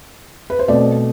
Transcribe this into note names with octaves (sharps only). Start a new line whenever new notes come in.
B4
C5
B2 A3 C4 D5